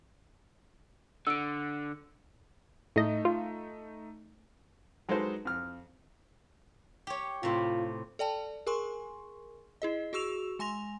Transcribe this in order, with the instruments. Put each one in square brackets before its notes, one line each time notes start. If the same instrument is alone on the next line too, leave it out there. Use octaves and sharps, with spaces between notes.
[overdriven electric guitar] D3 [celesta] E6 D7
[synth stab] A2 D#5 [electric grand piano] A3 D#4 E5
[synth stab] F4
[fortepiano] F#3 G#3 D#4 A4 B4 C5
F2 F6
[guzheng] G4 C#5
[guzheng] A2 C3 [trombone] F4
[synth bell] A4 D5 G5 A5
G#4 A#4 G#5 C6 C#6
E4 G#4 D#5
F#4 G#4 C#6 E6 E7 F7
G#3 G#5 C6 A#6 F7